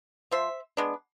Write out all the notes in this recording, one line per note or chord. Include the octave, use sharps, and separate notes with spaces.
F3 C5 E5
G#3 B3 D4